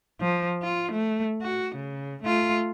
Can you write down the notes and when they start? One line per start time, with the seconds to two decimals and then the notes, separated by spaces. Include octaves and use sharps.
0.20 F3
0.63 F4
0.92 A3
1.42 F#4
1.75 C#3
2.23 A3 F4